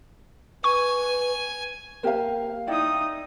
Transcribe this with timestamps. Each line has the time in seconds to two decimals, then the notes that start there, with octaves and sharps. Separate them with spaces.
0.64 B4 G#5 C#6
2.03 A#3 G4 A#4 C5 F5
2.67 D#4 E4 D5 G5 D#6